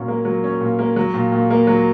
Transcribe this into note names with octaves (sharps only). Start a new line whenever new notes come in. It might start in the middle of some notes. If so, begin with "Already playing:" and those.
Already playing: A#2 F#3 C#4
A#3
F#3
C#4
A#2
A#3
F#3
A#2
A#2
A#3
F#3